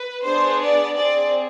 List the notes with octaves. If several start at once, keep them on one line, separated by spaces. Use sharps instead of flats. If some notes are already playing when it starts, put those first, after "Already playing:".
Already playing: B4
B3 D4 G#4 C5
D5
C4 G#4 D5